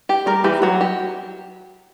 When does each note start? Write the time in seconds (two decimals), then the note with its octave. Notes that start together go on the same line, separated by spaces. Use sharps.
0.09 G4
0.26 G3 A#4
0.44 E3 G4
0.62 F#3 F#4
0.81 G4